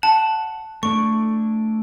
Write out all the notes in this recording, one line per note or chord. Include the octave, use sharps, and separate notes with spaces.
F#5 A5
A3 D4 E4 C#6